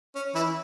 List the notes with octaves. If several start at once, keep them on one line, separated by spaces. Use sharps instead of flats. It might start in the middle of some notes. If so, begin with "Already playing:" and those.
C#4
E3 E4